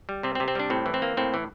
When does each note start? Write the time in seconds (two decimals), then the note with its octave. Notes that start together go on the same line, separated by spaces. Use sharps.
0.09 G3
0.23 C3 C4
0.35 C4
0.40 C3
0.48 C4
0.55 G3 D4
0.70 A2 C4
0.86 E3
0.94 C4
1.02 A#3
1.17 A2 C4
1.34 E3